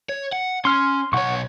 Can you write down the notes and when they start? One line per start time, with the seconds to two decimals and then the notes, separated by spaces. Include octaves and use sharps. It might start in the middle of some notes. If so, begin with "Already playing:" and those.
0.09 C#5
0.33 F#5
0.65 C#4 C6 F6
1.13 B1 C#5 F#5 C#6